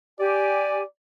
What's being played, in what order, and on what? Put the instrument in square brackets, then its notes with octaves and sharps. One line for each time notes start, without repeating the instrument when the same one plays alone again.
[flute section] G4 G#5 [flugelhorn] D5